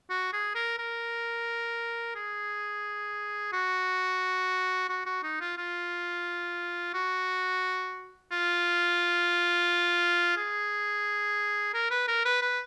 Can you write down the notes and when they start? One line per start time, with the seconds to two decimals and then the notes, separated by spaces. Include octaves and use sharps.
0.10 F#4
0.33 G#4
0.55 A#4
0.78 A#4
2.15 G#4
3.52 F#4
4.89 F#4
5.06 F#4
5.23 D#4
5.40 F4
5.57 F4
6.94 F#4
8.31 F4
10.36 G#4
11.74 A#4
11.91 B4
12.08 A#4
12.25 B4
12.42 B4